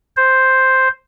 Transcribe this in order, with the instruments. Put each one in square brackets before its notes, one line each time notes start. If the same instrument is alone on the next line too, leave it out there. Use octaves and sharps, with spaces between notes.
[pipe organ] C5